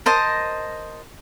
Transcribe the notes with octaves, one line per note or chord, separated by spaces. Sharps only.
A#4 C5 D#5 A5